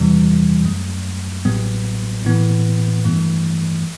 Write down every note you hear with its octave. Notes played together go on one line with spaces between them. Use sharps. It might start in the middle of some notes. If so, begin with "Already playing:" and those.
Already playing: E2 C3 E3 G3
F#2 F#3 A3
A1 A2 F#3 B3
A2 E3 B3
G2 E3 A3